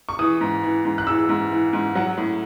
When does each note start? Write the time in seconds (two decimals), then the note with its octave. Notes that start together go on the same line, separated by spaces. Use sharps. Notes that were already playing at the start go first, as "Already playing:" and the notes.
0.09 C#6
0.19 E3 D#6
0.41 G#2
0.63 E3
0.85 G#2
0.98 F#6
1.07 E3 E6
1.29 G#2
1.52 E3
1.73 G#2
1.95 F#3 F#5
2.17 A2